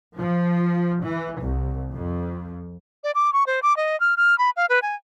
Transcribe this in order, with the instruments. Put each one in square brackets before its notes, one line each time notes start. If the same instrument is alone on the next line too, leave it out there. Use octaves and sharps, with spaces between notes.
[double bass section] F3
E3
C2
F2
[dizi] D5
D6
C#6
C5
D6
D#5
F6
F6
B5
F5
B4
G#5